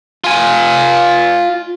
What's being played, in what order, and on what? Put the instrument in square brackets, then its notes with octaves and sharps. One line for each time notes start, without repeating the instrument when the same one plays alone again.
[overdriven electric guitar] F4 G#5